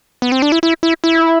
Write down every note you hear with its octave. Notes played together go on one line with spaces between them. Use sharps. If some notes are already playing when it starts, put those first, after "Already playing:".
B3
C4
D4
E4
E4
E4
E4